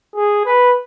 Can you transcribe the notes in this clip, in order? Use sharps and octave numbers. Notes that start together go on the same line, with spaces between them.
G#4
B4